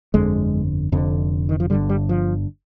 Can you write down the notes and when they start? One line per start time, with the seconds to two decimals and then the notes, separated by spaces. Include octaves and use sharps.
0.14 G1 F2 D3 G#3
0.92 F1 F2 D3
1.49 D#3
1.60 F3
1.70 G1 G2 D3 G3
1.89 G3
2.09 F3